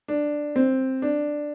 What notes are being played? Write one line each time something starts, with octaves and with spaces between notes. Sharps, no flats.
D4
C4
D4